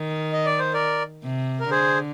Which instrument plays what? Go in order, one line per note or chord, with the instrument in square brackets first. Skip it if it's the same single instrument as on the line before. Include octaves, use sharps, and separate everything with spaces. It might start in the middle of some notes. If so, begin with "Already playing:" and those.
Already playing: [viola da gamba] D#3
[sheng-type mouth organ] D#5
D5
C5
A#4 D5
[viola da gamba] C3
[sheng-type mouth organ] A#4
[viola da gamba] D3 [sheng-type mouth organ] G#4 C5